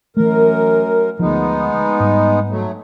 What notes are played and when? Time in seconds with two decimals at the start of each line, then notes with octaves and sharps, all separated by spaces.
0.17 F#2 E3 A3 A#4
1.19 D2 F3 G#3 B3 D#4
2.00 G#2 G3
2.49 F#3 A3